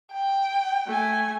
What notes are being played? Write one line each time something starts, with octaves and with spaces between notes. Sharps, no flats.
G5
A3 G#5